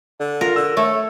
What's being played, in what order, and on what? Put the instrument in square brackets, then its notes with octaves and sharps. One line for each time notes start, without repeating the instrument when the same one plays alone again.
[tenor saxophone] D3
[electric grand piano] F4 [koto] A#4
[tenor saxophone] D3 [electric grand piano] E6
[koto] A3 [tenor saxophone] C#5